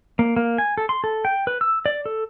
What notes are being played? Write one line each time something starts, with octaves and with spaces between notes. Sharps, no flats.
A#3
A#3
G#5
A4
C6
A4
G5
B4
E6
D5
A4